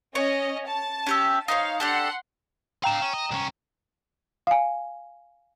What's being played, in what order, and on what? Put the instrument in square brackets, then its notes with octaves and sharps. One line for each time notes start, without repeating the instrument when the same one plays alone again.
[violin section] C#4 D#5 [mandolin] C#5
[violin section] A5
[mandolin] C#4 G4 E5
[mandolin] D#4 C5 C#5 [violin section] F5
[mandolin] D4 G4 A4 [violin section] F#5 C6
[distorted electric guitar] D4 F5 [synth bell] G5 A#5 E7
[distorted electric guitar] C#4
D#5
C2 C#4
[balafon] F5 G#5